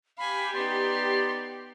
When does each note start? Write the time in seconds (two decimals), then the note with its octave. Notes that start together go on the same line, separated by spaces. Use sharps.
0.18 G4 F5 G#5 B5
0.54 B3 D#4 D5 C6